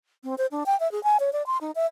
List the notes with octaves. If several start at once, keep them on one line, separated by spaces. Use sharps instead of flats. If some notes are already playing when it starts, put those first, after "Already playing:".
C4
C5
D4
G5
E5
G#4
G#5
C#5
D5
C6
D#4
E5